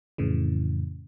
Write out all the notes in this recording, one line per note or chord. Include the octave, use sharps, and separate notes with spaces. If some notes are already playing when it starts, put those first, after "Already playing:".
F2 A2 C#3 E3